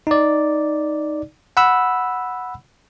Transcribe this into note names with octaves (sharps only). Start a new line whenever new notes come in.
D#4 D5
F#5 B5 E6